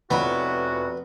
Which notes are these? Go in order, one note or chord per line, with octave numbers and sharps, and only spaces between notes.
F1 F2 B3 C#4 E4 F#4 B5